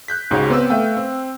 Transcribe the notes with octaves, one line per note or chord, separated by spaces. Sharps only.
F#6 G6 B6
C#2 G#2 C#3 F#4 G4 C#5
B3 C4 B4 D6 E6
A3 B4 E5 F5 G5
C4